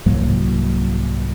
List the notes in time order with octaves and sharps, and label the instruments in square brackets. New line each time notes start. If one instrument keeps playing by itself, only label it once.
[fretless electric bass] C2 G#2 F#3 A#3